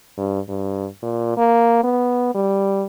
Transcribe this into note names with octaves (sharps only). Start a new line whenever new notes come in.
G2
G2
A#2
A#3
B3
G3